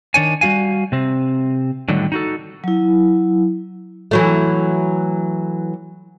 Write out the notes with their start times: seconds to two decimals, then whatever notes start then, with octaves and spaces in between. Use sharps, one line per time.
0.14 D#3 D4 C#5 G#5
0.41 G3 C4 F#4 F5 G#5
0.92 C3 C4
1.89 A2 D3 D#3 F#3 G3
2.12 D#4 F#4 A4
2.64 F#3 E4
4.11 E3 F#3 A3